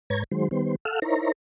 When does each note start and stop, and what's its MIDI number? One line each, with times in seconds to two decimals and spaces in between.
0.10 0.24 44
0.10 0.24 71
0.10 0.24 73
0.10 0.24 82
0.10 0.24 92
0.31 0.48 51
0.31 0.48 54
0.31 0.48 56
0.31 0.48 72
0.51 0.76 51
0.51 0.76 55
0.51 0.76 59
0.51 0.76 72
0.85 0.99 69
0.85 0.99 77
0.85 0.99 78
0.85 0.99 88
0.85 0.99 89
1.02 1.32 63
1.02 1.32 64
1.02 1.32 70
1.02 1.32 72
1.02 1.32 73
1.02 1.32 82